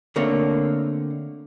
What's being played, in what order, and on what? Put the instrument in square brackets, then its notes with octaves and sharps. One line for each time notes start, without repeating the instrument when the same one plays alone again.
[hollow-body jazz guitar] D3 A3 A#3 C4 C#5